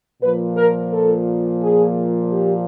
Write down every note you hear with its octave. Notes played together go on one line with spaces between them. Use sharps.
A#2 F3 B4
A#4
A4
G#4
G4